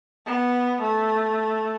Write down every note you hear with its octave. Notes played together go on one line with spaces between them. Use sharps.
B3
A3